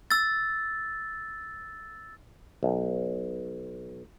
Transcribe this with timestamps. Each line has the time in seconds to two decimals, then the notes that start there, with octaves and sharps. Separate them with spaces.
0.11 E6 A6
2.63 B1